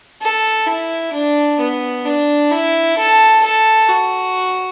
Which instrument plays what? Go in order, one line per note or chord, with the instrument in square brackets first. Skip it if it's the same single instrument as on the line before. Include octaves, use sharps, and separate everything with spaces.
[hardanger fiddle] A4
E4
D4
B3
D4
E4
A4
A4
F#4